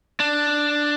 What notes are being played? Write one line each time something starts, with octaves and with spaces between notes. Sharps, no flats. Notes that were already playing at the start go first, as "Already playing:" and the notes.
D4